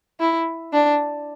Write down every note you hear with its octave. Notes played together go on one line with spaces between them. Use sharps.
E4
D4